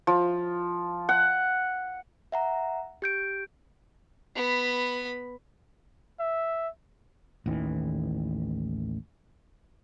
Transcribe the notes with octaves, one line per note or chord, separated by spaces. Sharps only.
F3
F#5
E5 F#5 A#5
G4 G6 D7
B3 B5
E5
A1 D#2 D#3 E3